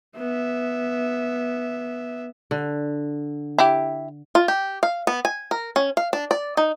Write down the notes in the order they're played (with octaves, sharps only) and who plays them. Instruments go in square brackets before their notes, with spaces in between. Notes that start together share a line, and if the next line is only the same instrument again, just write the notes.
[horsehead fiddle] B3 E5
[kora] D3
[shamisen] E4 G4
[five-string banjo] F4
G4
F5
B3
G#5
A#4
C#4
F5
D4
D5
D#4